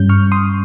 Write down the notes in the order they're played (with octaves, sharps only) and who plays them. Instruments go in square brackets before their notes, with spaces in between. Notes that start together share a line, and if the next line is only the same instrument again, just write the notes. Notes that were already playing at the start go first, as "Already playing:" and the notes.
Already playing: [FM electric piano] G2 G3 C#4 G6
C#6 F6
C6 D#6